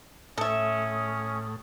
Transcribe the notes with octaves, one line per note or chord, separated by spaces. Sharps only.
A2 C#4 A4 E5 D#6